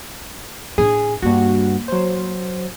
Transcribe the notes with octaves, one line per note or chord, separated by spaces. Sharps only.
A2 D4 G#4
G2 A#3 F#4
F#3 C5